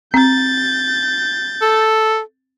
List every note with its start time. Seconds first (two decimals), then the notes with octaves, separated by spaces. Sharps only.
0.14 C4 G6 A6
1.62 A4